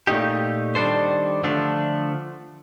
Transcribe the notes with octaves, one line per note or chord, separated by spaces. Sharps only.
A#2 A3 D#4 G4
D#3 G3 D4 A4 C5
D3 F3 A3 D4